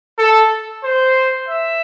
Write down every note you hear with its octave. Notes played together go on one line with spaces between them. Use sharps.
A4
C5
E5